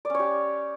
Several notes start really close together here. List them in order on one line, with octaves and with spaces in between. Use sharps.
D5 C#4 C#5 G4